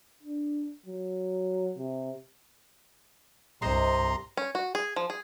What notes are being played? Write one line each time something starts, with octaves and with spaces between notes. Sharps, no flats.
D4
F#3
C3
C2 G2 C3 C5 D#5 A#5 C6
C#4
F#4
G#4
F3
G#4